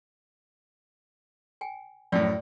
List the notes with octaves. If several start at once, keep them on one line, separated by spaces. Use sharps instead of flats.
G5 G#5
F#2 A2 D5 G5 A5